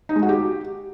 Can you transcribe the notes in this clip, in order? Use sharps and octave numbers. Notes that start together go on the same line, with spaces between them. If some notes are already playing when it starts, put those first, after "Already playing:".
D#4
G#3
F#4
G4